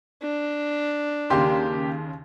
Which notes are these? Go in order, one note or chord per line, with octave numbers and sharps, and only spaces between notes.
D4
D#2 C#3 A#3 G4 C6